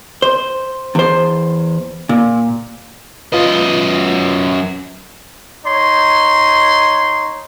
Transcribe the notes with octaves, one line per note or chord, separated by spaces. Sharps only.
C5
E2 C5
A#2
F#2 F4 B4 D#5
D#4 C#5 C6